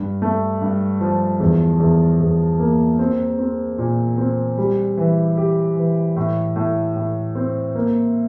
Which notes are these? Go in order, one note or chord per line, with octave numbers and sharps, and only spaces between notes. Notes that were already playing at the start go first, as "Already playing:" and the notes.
Already playing: G2
A3
G2
F3
E2
E2
E2
A#3
C4
C4
A#2
C4
G3
E3
G4
E3
A2
A2
A2
C4
A#3